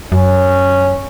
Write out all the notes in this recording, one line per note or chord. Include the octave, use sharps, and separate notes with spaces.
F#2 C#4